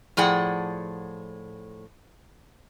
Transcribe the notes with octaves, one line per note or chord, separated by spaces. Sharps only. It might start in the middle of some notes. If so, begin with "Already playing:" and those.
A2 F3 G#4 D5 F#5 G5